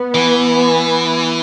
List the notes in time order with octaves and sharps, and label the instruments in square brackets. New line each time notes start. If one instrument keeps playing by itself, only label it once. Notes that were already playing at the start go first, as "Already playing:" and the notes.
Already playing: [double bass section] B3
[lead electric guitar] E3